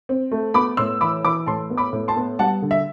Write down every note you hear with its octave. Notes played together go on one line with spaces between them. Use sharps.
C4
A3
B3 B5 D6
A2 C6 E6
E3 B5 D6
E3 B5 D6
A2 A5 C6
B3
B5 D6
A2
A5 C6
B3
G3 F#5 A5
D3
E5